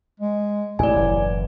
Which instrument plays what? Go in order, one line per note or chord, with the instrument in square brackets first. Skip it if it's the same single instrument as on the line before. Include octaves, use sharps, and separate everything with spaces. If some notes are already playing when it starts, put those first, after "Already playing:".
[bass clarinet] G#3
[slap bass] A1 C3 [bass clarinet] A2 [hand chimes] D5 G#5
[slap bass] F#1 E3